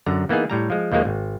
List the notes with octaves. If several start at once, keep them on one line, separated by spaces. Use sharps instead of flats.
F#2 D3 A#5
E3 A#3 B3 D#4 G#4
A2 G3 A#5
F3 G#3
D#2 D#3 F3 G#3 A#3
G#1